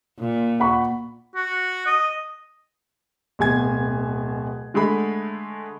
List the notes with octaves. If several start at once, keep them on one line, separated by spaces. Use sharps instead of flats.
A#2
F#5 B5 C#6
F#4
D#5
D1 B2 G#4 G#5 G#6
D3 G#3 A3 G#4 B5